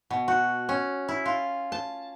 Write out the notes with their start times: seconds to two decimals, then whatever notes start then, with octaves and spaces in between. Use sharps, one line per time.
0.10 B2
0.28 F#4
0.69 C#4
1.09 E4
1.26 F4
1.72 A5